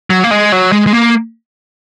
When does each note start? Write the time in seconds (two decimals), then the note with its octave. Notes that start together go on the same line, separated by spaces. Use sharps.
0.10 F#3
0.24 A#3
0.31 G#3
0.52 F#3
0.72 G#3
0.87 G#3
0.93 A#3